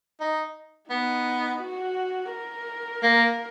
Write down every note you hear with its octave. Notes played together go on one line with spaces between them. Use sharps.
D#4
B3 D#4
F#4
A#4
A#3